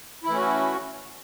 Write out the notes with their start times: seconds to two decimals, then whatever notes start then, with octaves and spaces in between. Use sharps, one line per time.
0.24 E4
0.27 E3
0.30 A3
0.34 C#4
0.37 F#4